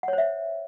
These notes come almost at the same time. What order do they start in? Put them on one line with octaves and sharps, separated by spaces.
F#5 C#5 C5 E5